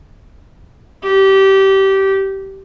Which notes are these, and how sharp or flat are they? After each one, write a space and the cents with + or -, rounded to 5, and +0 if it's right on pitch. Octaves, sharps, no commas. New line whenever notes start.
G4 -20